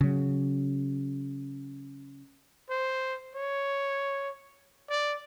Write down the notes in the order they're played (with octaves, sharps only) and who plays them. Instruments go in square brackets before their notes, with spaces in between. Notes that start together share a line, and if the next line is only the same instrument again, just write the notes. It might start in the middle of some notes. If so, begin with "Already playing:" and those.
[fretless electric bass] C#3 F#3
[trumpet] C5
C#5
D5